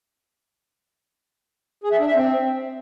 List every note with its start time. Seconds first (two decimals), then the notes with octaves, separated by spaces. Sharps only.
1.84 G#4
1.92 E5
1.99 D4
2.07 E5
2.15 C4